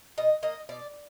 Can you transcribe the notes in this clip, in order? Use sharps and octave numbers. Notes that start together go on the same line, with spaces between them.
B2 D#5
A#3 D#5
B2 D5